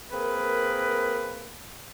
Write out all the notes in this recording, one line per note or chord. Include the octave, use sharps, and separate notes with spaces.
A#3 C4 G#4 A#4 B4